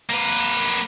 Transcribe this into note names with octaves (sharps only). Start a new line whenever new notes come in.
A#3 B4